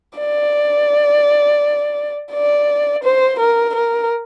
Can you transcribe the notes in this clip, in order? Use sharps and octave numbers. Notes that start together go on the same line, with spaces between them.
D5
D5
C5
A#4
A#4